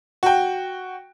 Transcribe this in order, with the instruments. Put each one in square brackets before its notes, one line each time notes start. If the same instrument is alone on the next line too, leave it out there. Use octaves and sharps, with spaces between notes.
[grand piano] F#4 G5